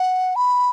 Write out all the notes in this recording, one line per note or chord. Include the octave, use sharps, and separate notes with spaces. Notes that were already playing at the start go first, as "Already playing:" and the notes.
Already playing: F#5
B5